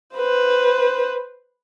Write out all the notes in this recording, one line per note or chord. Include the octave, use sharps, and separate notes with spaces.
B4 C5